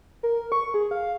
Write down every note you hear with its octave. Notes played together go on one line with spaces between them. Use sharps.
A#4
C#6
G#4
F5